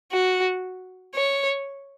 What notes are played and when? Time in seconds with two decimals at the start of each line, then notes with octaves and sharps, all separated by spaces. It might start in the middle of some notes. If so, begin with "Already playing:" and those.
0.12 F#4
1.15 C#5